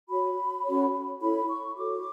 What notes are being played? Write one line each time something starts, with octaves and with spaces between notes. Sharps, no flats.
F#4 C#5 B5
C#4 F#4 A4 C#5
E4 A4 C#5 B5
C#6
F#4 A4 C#5 D6